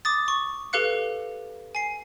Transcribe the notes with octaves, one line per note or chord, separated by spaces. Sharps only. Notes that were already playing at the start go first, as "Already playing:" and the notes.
D6 D#6 A6
C#6
G4 A4 B4 F5 F#6 C#7
G#5 C7